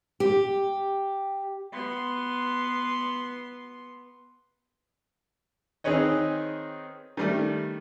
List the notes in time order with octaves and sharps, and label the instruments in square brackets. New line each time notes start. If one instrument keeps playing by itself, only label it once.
[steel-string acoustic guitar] G4
[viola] B3 C6
[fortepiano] D#3 C4 G#4 B4 C#5 D#5
D#3 G3 A3